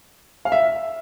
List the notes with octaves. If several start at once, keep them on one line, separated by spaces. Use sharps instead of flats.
F5
E5